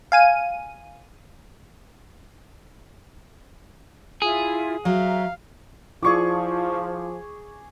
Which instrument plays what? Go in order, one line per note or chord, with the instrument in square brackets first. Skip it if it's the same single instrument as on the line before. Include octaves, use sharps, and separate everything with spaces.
[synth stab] F5 G#5 D#7
[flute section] E4 F4 [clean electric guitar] G#4
[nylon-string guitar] F#3 [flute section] E5 A#5 [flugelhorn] F5
[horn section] F3 [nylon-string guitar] E4 F4 D5 [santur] G#4 C#6 D6